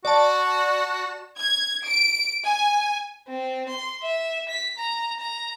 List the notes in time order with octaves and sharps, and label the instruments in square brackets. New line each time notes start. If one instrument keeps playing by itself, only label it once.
[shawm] F#4 [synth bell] D5 A5
[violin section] G#6
D7
G#5
[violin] C4
C6
E5
B6
A#5
A#5